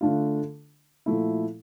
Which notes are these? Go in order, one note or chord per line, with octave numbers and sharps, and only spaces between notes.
D3 A3 D4 F4
A#2 F3 A3 E4